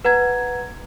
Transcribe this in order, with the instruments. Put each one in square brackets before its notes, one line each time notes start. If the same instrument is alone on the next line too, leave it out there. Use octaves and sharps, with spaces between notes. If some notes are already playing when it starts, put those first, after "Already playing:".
[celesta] B4 F#5 A#5 G#6